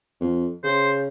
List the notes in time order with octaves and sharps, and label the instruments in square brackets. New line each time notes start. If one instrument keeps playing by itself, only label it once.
[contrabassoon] F2
[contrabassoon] C#3 [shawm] C5